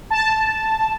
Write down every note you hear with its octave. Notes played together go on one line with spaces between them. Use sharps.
A5